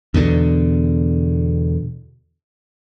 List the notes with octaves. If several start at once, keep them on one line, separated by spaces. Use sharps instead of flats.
E2 B2 D3